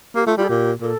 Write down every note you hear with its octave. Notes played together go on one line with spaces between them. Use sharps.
A#3 G4
A3 F4
G3 F4
A4
A#2 G4
A#2 A4